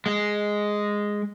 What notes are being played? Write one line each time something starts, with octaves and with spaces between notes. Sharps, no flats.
G#3